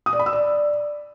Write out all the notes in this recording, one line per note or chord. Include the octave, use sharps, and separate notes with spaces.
D#6
D5
B5
E6
D5